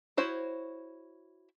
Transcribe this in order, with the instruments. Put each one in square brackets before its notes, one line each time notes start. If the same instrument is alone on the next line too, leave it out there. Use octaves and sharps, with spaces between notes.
[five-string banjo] E4 F#4 C5 C#5